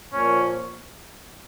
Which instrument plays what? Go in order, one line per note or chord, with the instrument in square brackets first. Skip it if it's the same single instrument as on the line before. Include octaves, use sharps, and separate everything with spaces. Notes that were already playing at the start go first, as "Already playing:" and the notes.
[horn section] A#2 F3 A#3 C#4